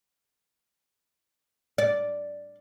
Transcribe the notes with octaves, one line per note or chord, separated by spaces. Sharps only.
D5